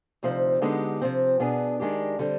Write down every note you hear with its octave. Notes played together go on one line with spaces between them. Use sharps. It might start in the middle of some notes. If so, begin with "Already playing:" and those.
D2 C3 F3 C4 D#4
D3 G#3 B3 D#4 G4
C3 F3 C4
B2 B3 D4 G#4
D#3 G#3 D4 G4
D3 G3 C4